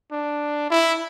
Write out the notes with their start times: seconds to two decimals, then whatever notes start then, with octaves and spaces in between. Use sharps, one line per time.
0.12 D4
0.70 E4